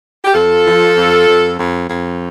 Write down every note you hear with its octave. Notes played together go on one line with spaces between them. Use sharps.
G4
F2 F4 A4
F3
F2
F2
F2
F2